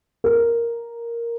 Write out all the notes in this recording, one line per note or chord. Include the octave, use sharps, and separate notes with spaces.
A#4